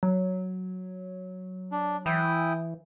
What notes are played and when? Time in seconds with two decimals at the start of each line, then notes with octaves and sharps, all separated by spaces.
0.03 F#3
1.72 D4
2.06 E3 E4 G5 D#6